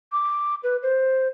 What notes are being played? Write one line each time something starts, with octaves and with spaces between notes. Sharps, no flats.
D6
B4
C5